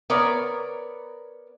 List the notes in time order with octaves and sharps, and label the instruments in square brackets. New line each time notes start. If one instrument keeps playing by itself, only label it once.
[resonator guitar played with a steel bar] B3 A#4 C#5 D5